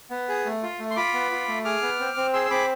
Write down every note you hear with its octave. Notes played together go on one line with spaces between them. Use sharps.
B3
G#4
A3
F4
A3
C6
F4 B5 D6
B3
F4
A3
G#4 D6 F6
B3
C4
C4
G#4 C6 E6
E6
C4 B5 D6